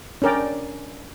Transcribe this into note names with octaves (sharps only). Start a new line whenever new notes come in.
C#4 D4 A#4 D5 G5